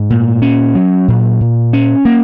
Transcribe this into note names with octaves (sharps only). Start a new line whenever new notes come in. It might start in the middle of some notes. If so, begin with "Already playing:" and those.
Already playing: G#2
A#2
C#4
F#3
A#2
A#2
C#4
A#3